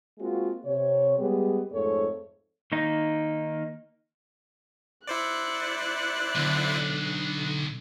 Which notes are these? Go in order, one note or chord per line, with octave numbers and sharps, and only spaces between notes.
G#3 A#3 C4 F4 F#4
C3 C#5
G3 G#3 B3 G4 G#4
F2 G#2 A3 G#4 A4 C#5
D#3 A#3 D#4
E4 C5 D5 F#6 C#7
B1 D3